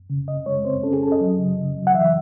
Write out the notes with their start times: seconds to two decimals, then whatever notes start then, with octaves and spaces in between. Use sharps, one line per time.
0.10 C#3
0.28 C#3 D#5
0.46 G#3 C#5
0.65 C4 C5
0.83 C#4 A4
0.93 G#4
1.02 C#4 A4
1.12 D#5
1.21 F#3
1.39 C#3
1.57 C#3
1.76 F#3
1.87 F#5
1.94 E3 E5